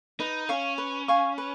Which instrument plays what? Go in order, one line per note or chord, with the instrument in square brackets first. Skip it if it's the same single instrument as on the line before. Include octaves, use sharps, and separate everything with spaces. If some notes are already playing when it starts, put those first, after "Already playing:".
[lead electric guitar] D#4 [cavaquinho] B4
[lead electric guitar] C#4 [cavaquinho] F5 G#5 C#6
[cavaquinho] B4
F5 G#5 C#6
B4